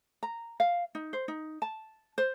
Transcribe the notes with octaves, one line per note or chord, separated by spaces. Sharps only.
A#5
F5
D#4
C5
D#4
A5
C5